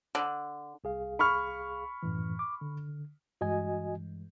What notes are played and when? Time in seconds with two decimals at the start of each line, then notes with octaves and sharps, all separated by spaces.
0.15 D3
0.84 C2 G#4 F5
1.19 B5 C#6 F6
2.03 F#2 A2 E3
2.39 D6
2.61 D3
3.41 G2 E3 G#3 F#4 D#5 G#5